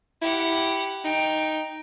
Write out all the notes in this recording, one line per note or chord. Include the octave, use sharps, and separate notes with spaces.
E4 G4 F#5
D#4 G5